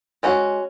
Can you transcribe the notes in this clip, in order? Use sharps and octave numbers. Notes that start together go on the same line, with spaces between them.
G#3 C#4 F#4